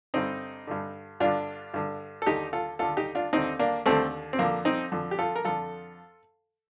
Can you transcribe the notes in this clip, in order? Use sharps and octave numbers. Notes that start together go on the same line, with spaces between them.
G2 D3 C4 D#4
G2 D3
G2 D3 D4 F4
G2 D3
A4
D#2 D3 D#4 G4
F4 A4
D#2 D3 F4 A4
D#4 G4
D4 F4
D#2 D3 C4 D#4
A#3 D4
D#2 D3 A3 C4
C4
F2 D3 A#3
C4 D#4
F2 D3
G4
F4 A4
A#4
F2 D3 F4 A4